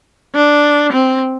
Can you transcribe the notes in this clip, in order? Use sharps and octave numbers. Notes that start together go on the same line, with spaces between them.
D4
C4